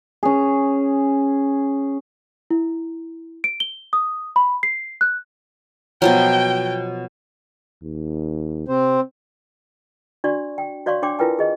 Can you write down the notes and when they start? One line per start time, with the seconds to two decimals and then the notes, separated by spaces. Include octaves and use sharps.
0.23 C#4 G#4
2.50 E4
3.44 D7
3.60 G7
3.93 D#6
4.36 B5
4.63 C7
5.01 F#6
6.02 B2 F3 F#3 G5
7.83 D#2
8.68 C3 C4 C5
10.24 D4 F#4 D5 C#6
10.58 G5
10.86 F#4 C#5 D5 F5 C6 C#6
11.02 D4 C#5 G5 C6 D6
11.19 E4 F4 A#4 B4 G5 G#5
11.39 G#4 D#5